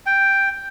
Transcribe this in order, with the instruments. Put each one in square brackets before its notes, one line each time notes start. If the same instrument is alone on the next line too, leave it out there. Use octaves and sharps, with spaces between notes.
[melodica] G5